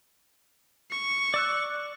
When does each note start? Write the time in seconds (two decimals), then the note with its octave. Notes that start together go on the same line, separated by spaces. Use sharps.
0.91 C#6
1.34 D5 E6 F#6